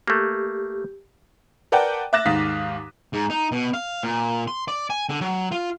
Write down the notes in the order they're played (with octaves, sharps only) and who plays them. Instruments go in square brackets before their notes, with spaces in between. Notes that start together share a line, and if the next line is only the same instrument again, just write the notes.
[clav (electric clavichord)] A3 A#3 [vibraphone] G4
[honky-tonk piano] A#4 B4 D5 F#5 G5 A5
E5 D6 F#6 A6 A#6 E7
D#2 G#2 D#3 F5 D#6 B6
[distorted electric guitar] G#2
D#4
B2
F5
A#2
C6
D5
G#5
D3
F#3
F4